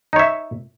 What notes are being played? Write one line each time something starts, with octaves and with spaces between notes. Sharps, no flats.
D#4 C#5 E5